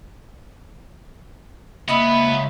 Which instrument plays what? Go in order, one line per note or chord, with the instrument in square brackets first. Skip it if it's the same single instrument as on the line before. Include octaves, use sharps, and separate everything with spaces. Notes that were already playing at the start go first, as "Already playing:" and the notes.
[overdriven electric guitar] C#2 B5 [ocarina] A#3 [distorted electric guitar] B3 [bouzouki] E4 D#5 E5